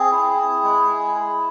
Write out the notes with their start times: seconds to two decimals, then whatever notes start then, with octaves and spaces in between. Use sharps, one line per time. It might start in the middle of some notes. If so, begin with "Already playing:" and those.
Already playing: C4 G#4
0.12 E4
0.37 E4
0.63 G#3
0.90 E4
1.16 E4